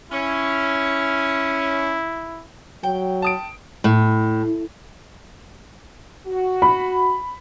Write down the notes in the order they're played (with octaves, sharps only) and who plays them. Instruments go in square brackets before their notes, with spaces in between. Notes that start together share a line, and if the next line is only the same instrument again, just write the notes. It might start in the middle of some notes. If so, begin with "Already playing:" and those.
[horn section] C#4 [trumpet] E4
[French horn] F#3 [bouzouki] G5
[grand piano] A5 D#6 D7
[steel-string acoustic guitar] A2
[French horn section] F#4
[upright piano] B5